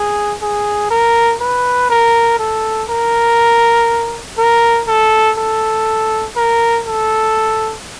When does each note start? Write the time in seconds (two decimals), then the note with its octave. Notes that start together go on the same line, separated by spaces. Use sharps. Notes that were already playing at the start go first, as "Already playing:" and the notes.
Already playing: G#4
0.42 G#4
0.91 A#4
1.40 B4
1.90 A#4
2.39 A4
2.89 A#4
4.38 A#4
4.88 A4
5.38 A4
6.36 A#4
6.86 A4